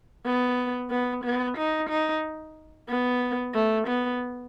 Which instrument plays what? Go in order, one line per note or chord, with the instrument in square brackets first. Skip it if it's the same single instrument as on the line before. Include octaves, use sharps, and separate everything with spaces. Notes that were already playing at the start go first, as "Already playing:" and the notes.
[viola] B3
B3
B3
D#4
D#4
B3
A3
B3